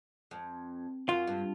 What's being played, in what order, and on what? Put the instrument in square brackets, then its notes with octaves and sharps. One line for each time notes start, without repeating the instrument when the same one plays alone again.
[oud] F2
[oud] F#2 [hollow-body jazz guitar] F4
[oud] G2